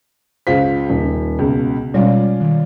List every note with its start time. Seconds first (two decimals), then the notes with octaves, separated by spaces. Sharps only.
0.47 C#2 F4 C5 B6
0.90 D#1
1.39 C#2 B2
1.94 B2 G3 G#3 C#4 F4 D5
2.40 D#3